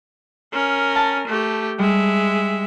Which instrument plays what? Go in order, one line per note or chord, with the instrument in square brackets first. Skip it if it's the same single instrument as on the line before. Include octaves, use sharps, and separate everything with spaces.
[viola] C#4 A#4
[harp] A5
[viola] A3 G4
[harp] G3 [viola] G#3 E5